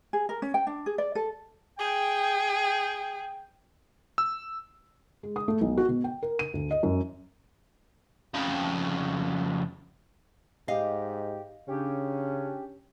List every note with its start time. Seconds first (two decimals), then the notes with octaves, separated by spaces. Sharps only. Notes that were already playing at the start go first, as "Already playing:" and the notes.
0.13 G#4
0.29 A#4
0.42 C#4
0.54 G5
0.67 D4
0.86 G#4
0.98 D5
1.15 A4
1.79 G#4 G5
4.18 E6
5.23 G#3
5.36 D#6
5.48 A3
5.61 B1
5.77 F#4
5.89 B2
6.04 G5
6.23 A#4
6.39 D#7
6.54 D2
6.71 D#5
6.83 F#2
8.34 F2 C#3
10.68 G#2 G4 D#5 F5
11.68 C#3 C#4 D4 G4